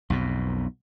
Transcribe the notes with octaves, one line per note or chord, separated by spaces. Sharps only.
B1 F2 B2